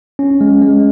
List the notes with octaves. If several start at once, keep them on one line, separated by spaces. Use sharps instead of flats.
C#4
G#3
G#3